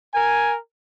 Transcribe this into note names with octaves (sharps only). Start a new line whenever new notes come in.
A#4 G#5